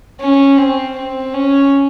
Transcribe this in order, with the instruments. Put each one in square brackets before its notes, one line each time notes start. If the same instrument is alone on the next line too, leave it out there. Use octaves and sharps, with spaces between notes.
[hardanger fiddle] C#4
C4
C4
C#4